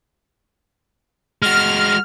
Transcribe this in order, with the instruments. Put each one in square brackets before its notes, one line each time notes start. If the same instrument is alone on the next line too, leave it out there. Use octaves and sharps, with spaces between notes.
[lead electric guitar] G#3 F#4 [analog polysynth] F6